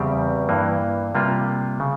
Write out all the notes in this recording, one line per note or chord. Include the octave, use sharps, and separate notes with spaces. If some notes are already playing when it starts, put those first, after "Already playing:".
Already playing: E2 C#3 G3 C4 G4
G2 E3 A#3
C3 G3 A#3 F4
C#3